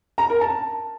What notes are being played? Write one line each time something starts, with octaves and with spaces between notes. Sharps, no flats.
A#5
A#4
A5